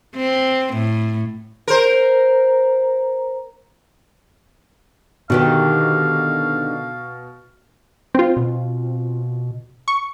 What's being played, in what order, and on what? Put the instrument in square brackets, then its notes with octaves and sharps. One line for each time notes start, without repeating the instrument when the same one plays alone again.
[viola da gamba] C4
A2
[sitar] A#4 C5
[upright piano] B2 [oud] D3 D#3 G4 [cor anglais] F5
[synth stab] C4 F4
[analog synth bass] B2
[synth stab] C#6